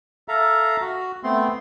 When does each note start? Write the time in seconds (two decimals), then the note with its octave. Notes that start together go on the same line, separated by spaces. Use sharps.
0.28 A4 E5 F5 A#5
0.81 F#4
1.24 A3 B3 C4 C6